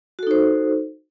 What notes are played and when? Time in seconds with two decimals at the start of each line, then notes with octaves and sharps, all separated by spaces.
0.19 F#4
0.23 A4
0.27 D#4
0.31 C5